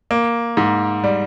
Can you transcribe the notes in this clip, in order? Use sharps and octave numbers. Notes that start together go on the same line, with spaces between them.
A#3
G#2
G3